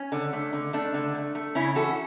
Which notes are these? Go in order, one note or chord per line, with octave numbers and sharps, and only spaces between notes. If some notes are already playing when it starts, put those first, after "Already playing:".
Already playing: C#4
D3
A3
D3
A3 D4
D3
A3
A3
C#3 C#4 E4
E3 F#4 A4